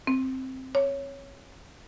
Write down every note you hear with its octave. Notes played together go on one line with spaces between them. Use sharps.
C4
C#5